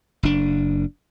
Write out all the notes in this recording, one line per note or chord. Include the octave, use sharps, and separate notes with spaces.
F#1 D4